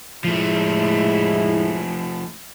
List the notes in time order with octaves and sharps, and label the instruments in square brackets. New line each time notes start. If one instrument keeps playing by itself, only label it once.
[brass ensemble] A2 G#3 E4 [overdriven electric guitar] F3 A3